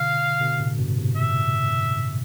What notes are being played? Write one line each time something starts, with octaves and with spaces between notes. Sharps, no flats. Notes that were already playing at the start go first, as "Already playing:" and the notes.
Already playing: B2 D3 F5
B2 D3
A2 C3
G2 B2
A2 C3
E5